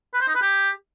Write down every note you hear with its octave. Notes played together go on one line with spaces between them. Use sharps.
B4
C5
D#4
B4
G4